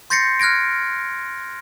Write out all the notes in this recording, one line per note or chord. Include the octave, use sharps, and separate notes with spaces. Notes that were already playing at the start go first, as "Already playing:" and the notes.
C6 G6 A6 A#6 C7 C#7
F6 F#6 G#6 A#6 D7